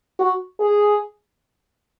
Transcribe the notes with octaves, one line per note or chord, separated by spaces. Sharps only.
F#4
G#4